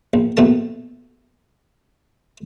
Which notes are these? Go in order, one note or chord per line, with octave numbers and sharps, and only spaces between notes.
A#1
A#1 B2 A3 A5